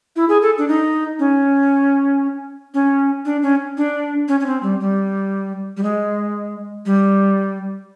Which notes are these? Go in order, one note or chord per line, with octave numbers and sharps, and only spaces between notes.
E4
G#4
A4
D4
D#4
C#4
C#4
D4
C#4
D4
C#4
C#4
C4
G3
G3
G3
G#3
G3